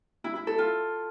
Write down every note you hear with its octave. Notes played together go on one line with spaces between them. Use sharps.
E4
E4
A4
F4